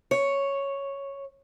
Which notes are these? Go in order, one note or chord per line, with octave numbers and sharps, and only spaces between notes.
C#5